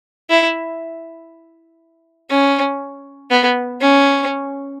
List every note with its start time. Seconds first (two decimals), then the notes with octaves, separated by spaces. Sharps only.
0.30 E4
2.30 C#4
3.30 B3
3.81 C#4